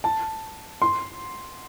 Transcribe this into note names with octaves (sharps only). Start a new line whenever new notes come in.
A5
C6